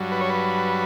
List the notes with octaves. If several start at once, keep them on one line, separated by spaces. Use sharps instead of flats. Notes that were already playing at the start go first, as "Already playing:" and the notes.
Already playing: G2 F#3
B4
C#5
B4